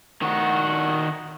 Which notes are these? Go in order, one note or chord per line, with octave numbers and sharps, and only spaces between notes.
D#3 F#4